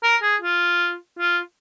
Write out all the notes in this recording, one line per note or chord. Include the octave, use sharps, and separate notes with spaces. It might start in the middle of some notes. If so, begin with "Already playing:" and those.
A#4
G#4
F4
F4